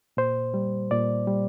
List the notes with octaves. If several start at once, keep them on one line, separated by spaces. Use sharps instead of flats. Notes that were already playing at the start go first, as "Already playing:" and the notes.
A#2 C5
G3
A#2 D5
G3